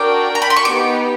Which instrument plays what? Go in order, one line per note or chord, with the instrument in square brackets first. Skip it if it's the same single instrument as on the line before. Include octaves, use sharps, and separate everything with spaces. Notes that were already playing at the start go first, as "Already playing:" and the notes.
Already playing: [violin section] D4 F#4 A#4 D5 G5 [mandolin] D6
[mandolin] A#5
B5
C6
C#6
[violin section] B3 D#4 G4 B4 [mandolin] D6